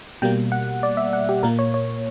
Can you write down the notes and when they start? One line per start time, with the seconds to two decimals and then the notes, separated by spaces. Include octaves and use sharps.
0.22 B2 G3 A#3 G5
0.52 F#5
0.83 D5
0.97 E5
1.13 F#5
1.29 G4
1.43 A#2 A#3 A#4
1.59 C#5
1.74 C#5